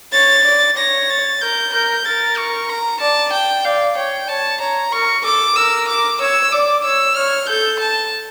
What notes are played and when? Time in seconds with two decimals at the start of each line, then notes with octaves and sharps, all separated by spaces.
0.13 C#5 A6
0.45 D5
0.77 C#5 A#6
1.09 A6
1.41 A#4 G6
1.73 A#4 G6
2.05 A#4 A6
2.37 C#6
2.69 A#5
3.00 D5 A5
3.33 G5
3.64 D5 F5
3.96 C#5 G5
4.28 C#5 A5
4.60 C#5 A#5
4.92 A#4 C#6
5.24 A4 D6
5.56 A#4 E6
5.88 D6
6.20 C#5 E6
6.52 D5 D6
6.84 C#5 E6
7.16 C#5 F6
7.49 A4 G6
7.80 A5